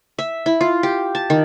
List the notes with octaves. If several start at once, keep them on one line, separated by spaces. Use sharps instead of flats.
E5
E4
F4
G4
A5
D#3